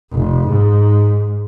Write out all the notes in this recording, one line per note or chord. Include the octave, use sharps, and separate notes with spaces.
F1
G#2